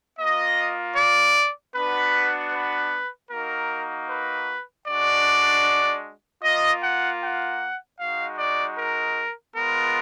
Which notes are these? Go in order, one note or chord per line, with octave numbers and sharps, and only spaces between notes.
A#3 F4 D#5
D5
B3 D4 F#4 B4
B4
A#3 D#4 F#4 A#4
B4
G#3 D4 F#4 D5
A#3 F4 D#5
F#5
F#5
G#3 D#4 F#4 F5
D5
A#4
G#3 B3 F4 A#4